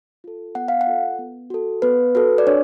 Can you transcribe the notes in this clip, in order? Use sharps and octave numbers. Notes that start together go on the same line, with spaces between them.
F4 A4
B3 F#5
F5
F#5
F4 A4
B3
F#4 A4
B3 B4
F#4 A4 B4
D5
D4 C#5